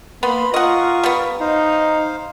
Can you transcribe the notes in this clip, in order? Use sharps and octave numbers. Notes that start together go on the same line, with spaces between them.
A#3 B3 B5 C6
F4 A#4 D#5 F#5 C#6 D#6
G3 B3
D#4 C5 F5